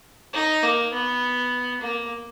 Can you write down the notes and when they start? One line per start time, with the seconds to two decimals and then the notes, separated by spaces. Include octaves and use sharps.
0.34 D#4
0.63 A#3
0.93 B3
1.81 A#3